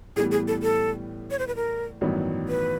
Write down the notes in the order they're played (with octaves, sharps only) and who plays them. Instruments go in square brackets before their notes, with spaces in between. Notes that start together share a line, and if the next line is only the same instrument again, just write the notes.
[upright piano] A2 E3 G3 B3 [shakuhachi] G#4
[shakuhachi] G#4
A4
A4
C#5
C5
B4
A#4
[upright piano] A1 G2 D#3 F#3 B3
[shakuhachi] B4